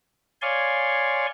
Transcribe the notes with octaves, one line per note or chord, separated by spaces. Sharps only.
C#5 D5 F5 G#5 C6 C#6